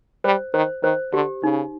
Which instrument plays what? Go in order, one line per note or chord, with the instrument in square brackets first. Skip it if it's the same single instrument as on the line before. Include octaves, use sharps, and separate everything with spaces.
[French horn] G3 [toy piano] C5
[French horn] D#3 [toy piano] C5
[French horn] D#3 [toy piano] C5
[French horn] D3 [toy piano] G4
[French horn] C#3 [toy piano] D#4